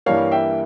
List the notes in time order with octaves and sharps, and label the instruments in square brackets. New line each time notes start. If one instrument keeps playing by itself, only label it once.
[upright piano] G2 E3 G3 A#3 C#5 F5
E5 G5